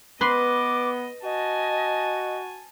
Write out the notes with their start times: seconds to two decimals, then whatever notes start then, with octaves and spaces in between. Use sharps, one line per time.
0.21 B3 B4 D#5 C6 D6
1.24 F#4 D#5 G#5 A5